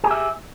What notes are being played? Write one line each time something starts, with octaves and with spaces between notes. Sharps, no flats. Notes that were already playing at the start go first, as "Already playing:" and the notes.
G4 G#4 E5